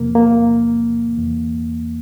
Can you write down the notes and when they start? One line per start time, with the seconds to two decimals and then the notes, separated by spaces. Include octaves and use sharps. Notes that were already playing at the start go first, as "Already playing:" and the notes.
Already playing: E2 C3 F3 A#3
0.15 A#3
1.17 E2 E3